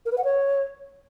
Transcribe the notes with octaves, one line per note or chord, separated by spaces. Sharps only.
A#4
B4
F#5
C#5